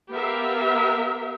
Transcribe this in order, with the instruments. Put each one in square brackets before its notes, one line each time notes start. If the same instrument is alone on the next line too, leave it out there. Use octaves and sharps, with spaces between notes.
[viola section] B3 G4 A#4 E5 F5